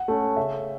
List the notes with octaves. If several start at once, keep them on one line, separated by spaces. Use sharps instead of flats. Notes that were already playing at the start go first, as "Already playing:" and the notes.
Already playing: F#5
A3 C#4
C#3 E5